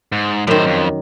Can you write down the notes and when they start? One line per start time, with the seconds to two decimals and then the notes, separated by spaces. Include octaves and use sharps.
0.12 G#2
0.47 F#2 A2 D#3 C5
0.66 F2